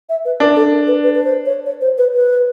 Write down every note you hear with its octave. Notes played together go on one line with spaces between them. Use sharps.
E5
B4
D4 A#4
A4
A#4
B4
B4
B4
C5
C#5
C#5
C5
B4
B4